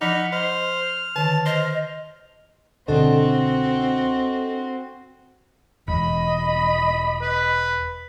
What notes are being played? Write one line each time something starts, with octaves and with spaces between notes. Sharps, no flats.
F3 D#4 F#5 B5 D6 F6
C5 D#5 F6
D3 D#3 A5
C5 D#5 F6
C2 B2 D3 C4 D4 F#4 A4 D#5
E1 D#5 B5
B4